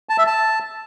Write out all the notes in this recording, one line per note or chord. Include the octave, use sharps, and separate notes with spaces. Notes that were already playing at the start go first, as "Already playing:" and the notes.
A5
E5
A5